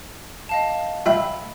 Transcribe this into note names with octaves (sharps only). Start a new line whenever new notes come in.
D#5 F5 A5
F4 E5 G5 B5